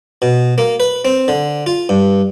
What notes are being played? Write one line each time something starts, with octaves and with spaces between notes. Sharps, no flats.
B2
A#3
B4
C4
D3
F4
G2